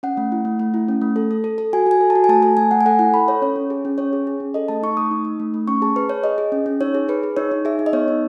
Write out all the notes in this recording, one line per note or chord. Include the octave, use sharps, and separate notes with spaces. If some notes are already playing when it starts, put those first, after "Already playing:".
C#4 F#5
A3
E4
A3
A3
E4
C#4
A3
A4
A4
A4
A4
F#4 G#5
F#4 G#5
A4
A5
F#4
G#5
A3 A5
A4 A5
A3 G#5
A3 F#5
G#5
A4 F#5
E4 F#5
A4 B5
A4 C#5
C#4 C#5
C#4
G#4
C#4
C#4 C#5
G#4
G#4
C#4
A4 D#5
A3 A5
D#4 C#6
A3 D#6
D#4
D#4
A3
A3
C#4 C#6
G#4 A5
G#4 B4
G#4 C#5
G#4 D#5
G#4
C#4
C#4
D#4 C#5
G#4
G#4 B4
G#4
D#4 C#5
D#4
G#4 E5
D#4
D#5
B3 C#5
D#4